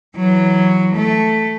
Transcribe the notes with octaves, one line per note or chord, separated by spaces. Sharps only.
E3 F#3
A3